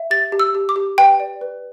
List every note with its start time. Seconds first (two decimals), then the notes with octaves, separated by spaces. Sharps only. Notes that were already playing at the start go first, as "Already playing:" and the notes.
Already playing: E5
0.10 G4 A6
0.32 G4
0.40 E6
0.55 G4
0.69 D6
0.76 G4
0.98 B4 G5
1.20 D5
1.41 B4